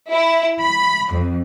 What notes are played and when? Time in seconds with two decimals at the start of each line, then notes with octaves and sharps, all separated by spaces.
0.11 E4
0.60 B5
1.12 F2